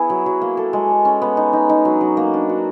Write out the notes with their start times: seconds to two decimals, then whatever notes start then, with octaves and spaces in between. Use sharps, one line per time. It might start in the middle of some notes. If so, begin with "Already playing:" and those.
Already playing: B3 E4 G#4
0.10 F#3
0.26 F#3
0.42 A#3
0.57 A4
0.73 G#3
0.90 A4
1.05 C#4
1.22 B3
1.37 D#4
1.53 D#4
1.69 D#4
1.85 F#3
2.01 F#3
2.17 A#3
2.34 D4
2.49 F#4